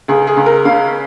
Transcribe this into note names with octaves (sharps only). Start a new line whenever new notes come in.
C#2 G#4
G#4
C#2
A#4
C#3 F5